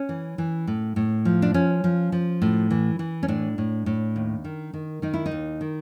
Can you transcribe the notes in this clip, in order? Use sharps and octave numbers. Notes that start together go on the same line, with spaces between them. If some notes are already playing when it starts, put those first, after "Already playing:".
Already playing: C#4
E3
E3
A2
A2
F3
D4
F3 C#4
F3
F3
A2
E3
E3
C#4
A2 D4
A2
A2
D#2
D#3
D#3
D#3 D#4
E4
D#4
D#2
D#3